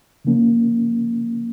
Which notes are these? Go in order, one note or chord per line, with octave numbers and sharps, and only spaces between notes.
C#3 F3 A#3 C#4